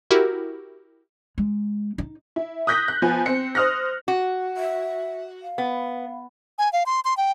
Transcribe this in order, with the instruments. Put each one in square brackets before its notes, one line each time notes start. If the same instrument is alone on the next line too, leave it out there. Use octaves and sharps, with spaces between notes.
[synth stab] E4 F#4 G4 A#4
[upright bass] G#3
D#4
[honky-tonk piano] E4
D#6 F#6 G6 A#6 B6
F#6
F3 B3 G#5
C4 C#7
C5 D#6 F6 F#6 A#6
[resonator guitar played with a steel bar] F#4
[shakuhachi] E5
F5
[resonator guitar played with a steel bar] B3
[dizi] G#5
F5
C6
C6
G5